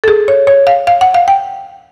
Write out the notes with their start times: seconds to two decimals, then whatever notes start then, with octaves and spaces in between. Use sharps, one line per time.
0.04 A4
0.08 G#4
0.28 C#5
0.47 C#5
0.67 F5
0.87 F5
1.01 F#5
1.14 F5
1.28 G5